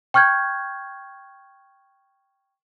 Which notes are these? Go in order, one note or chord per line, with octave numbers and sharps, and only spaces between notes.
G5 C#6 F6 G6 G#6